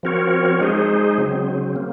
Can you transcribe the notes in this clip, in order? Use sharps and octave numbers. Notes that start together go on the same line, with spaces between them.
F3 C4 F#4 A#4 C#5
G#3 D#4 G#4 C5
C#3 F#3 C4
A#3